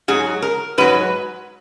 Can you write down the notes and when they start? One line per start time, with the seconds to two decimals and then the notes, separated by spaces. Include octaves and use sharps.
0.08 G#2 F#3 G#4
0.42 A#4
0.78 G#2 F#3 B4